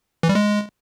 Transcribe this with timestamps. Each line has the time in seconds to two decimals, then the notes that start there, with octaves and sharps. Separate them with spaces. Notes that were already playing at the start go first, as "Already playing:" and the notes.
0.23 E3
0.29 G3
0.35 G#3